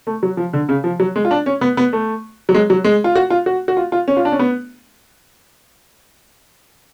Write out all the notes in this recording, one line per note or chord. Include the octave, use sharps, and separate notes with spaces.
A3
F#3
F3
D3
C#3
F3
F#3
G#3
F4
D4
C#4
B3
B3
A3
F#3
G#3
F#3
G#3
F4
F#4
F4
F#4
F#4
F4
F4
C#4
F4
D4
C#4
B3